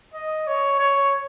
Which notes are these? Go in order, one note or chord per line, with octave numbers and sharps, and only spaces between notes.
D#5
C#5
C#5